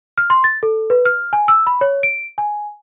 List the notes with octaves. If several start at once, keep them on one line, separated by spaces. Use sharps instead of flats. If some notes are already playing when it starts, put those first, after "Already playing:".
F6
C6
A6
A4
B4
F6
G#5
E6
B5
C#5
D7
G#5